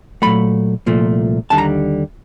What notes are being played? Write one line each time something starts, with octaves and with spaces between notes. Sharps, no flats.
A#2 F#3 A3 B5
C2 A#2 F3 A3
D#2 D3 G3 A5
A#5